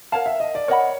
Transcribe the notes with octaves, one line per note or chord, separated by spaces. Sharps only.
A#4 C#5 F5 F#5 A5
E5
D#5
D5
A#4 C#5 D#5 F#5 B5